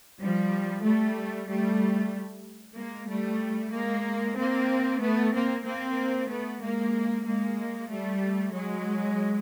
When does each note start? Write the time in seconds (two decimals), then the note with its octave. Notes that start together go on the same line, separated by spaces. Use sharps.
0.21 F3 G3
0.85 G3 A3
1.49 G3 A3
2.77 G#3 A#3
3.10 G3 A3
3.73 G#3 A#3
4.38 A#3 C4
5.01 A3 B3
5.34 A#3 C4
5.65 A#3 C4
6.29 A3 B3
6.61 G#3 A#3
7.27 G#3 A#3
7.90 G3 A3
8.54 F#3 G#3